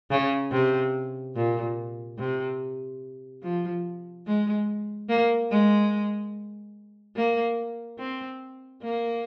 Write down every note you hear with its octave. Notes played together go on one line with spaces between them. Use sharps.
C#3
C3
A#2
C3
F3
G#3
A#3
G#3
A#3
C4
A#3